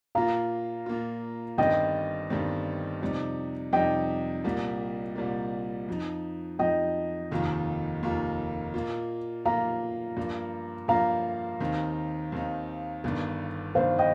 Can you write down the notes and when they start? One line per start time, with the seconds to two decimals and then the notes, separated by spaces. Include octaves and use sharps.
0.15 A#2 A#3 F4 F5 A#5
0.86 A#2 A#3 F4
1.58 G1 G2 D#3 G3 C4 D#5 G5
2.30 G1 G2 D#3 G3 C4
3.02 F2 C3 G3 D#4
3.73 F2 C3 G3 D#4 D#5 G5
4.44 C2 A#2 G3 A#3
5.16 C2 A#2 G3 A#3
5.88 F2 F3 D#4
6.59 F2 F3 D#4 D#5 G5
7.31 F1 D#2 D#3 A#3 F4
8.03 F1 D#2 D#3 A#3 F4
8.74 A#2 A#3 F4
9.45 A#2 A#3 F4 F5 A#5
10.17 G2 F3 A#3
10.88 G2 F3 A#3 F5 A#5
11.60 D#2 D#3 C4 D#4
12.32 D#2 D#3 C4 D#4
13.04 G1 G2 D#3
13.75 G1 G2 D#3 C5 F5
13.99 D#5 G5